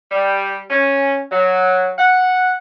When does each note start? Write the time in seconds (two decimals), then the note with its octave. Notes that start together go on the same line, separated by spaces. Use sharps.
0.11 G3
0.70 C#4
1.31 F#3
1.97 F#5